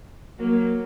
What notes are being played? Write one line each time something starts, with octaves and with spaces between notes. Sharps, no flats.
F#3 A#3